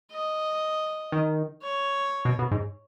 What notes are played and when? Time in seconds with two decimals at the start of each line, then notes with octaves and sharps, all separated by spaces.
0.12 D#5
1.12 D#3
1.62 C#5
2.25 B2
2.39 B2
2.51 G#2